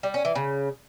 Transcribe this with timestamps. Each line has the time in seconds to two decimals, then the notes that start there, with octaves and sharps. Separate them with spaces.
0.03 G3
0.14 C#4
0.25 E3
0.35 C#3